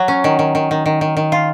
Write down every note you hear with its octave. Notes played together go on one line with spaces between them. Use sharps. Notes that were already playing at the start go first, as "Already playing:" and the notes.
Already playing: F#3
C#4
D#3
D#3
D#3
D#3
D#3
D#3
D#3
F4